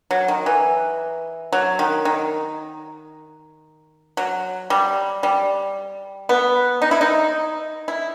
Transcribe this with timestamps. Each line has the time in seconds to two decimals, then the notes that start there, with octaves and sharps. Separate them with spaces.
0.11 F#3
0.28 D#3
0.46 E3
1.53 F#3
1.79 D#3
2.05 D#3
4.17 F#3
4.70 G3
5.23 G3
6.29 B3
6.82 D#4
6.91 E4
7.01 D#4
7.88 E4